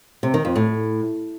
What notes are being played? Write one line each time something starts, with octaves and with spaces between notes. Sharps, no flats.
C3
D#3
F2
A2